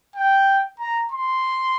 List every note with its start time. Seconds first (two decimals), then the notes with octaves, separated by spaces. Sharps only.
0.16 G5
0.80 A#5
1.12 C6